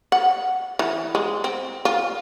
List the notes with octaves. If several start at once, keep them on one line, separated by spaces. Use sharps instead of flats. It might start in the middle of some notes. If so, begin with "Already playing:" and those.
F#5
E3
G#3
C4
F4